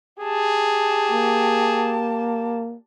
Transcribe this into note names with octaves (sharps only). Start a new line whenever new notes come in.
G4 G#4 A5
A#3